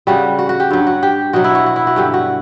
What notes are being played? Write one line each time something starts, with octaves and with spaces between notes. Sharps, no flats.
C#3 G3 F#4
F#4
F#4
G4
G2 F#3
F#4
G4
B2 F#3 F#4
E4
F#4
F#4
E4
F#4
G2 D3 F#3 G4
F#4